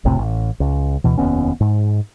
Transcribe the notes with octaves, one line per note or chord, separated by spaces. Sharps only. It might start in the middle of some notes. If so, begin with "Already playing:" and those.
F#1 C2 A2 C3
A1
C#2
D2 B2 E3
F1 D#2 B3 C#4
G#2